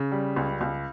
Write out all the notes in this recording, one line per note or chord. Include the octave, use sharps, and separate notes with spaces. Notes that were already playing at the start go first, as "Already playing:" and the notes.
Already playing: C#3
G3
C#2
C#2